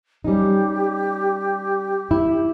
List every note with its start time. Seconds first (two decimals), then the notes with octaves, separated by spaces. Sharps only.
0.24 G3 C#4 D#4 G4
2.11 E4